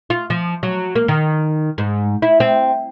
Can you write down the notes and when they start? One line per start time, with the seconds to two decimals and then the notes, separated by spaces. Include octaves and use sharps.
0.10 F4
0.30 F3
0.63 F#3
0.96 A#3
1.08 D#3
1.78 G#2
2.22 E4
2.40 C4